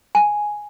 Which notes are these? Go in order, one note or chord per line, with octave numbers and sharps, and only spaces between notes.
G#5